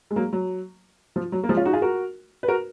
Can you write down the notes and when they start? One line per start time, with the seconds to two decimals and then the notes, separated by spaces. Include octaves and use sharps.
0.11 G#3
0.16 F#3 A#3
0.33 F#3
1.16 F3
1.32 F#3
1.43 A#3
1.49 F3 G#3
1.57 C#4 F4
1.65 D#4 F#4
1.73 F4 G#4
1.82 F#4 A#4
2.43 B4
2.48 F#4 A#4